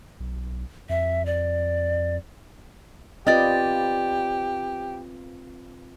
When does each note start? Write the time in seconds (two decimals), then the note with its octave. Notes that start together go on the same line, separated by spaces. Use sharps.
0.20 B1
0.89 F2 E5
1.26 D5
3.27 C4 F4 G4 B4 D5 D#5